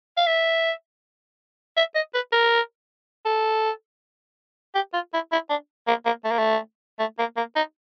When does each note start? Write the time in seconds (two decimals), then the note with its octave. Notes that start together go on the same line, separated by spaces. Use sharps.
0.17 F5
0.26 E5
1.77 E5
1.95 D#5
2.14 B4
2.33 A#4
3.26 A4
4.75 G4
4.94 F4
5.13 E4
5.32 E4
5.50 D4
5.88 A#3
6.06 A#3
6.25 A3
6.31 A#3
6.39 A3
6.99 A3
7.19 A#3
7.37 A#3
7.56 D#4